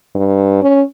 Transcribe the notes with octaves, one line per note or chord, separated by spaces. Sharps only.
G2
C#4